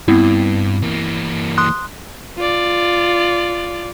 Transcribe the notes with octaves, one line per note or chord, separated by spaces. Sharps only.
G2 B3 C4 E4
E3 A#3
C6 D#6 F#6
F4 D5